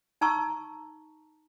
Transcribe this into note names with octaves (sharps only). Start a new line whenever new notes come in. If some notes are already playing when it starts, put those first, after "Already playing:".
D#4 A5 A#5 C#6 E6